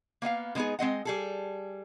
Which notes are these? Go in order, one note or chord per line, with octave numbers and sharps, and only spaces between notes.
A#3 B3 D#5 F5
D3 G#3 B3 D#4 G#4
G#3 C4 D#5 F#5
G3 G#4 A4